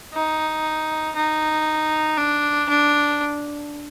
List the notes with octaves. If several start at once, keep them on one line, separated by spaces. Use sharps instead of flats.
D#4
D#4
D4
D4